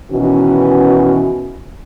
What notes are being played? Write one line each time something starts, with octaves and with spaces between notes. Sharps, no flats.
B2 D#3 E3 C#4 F#4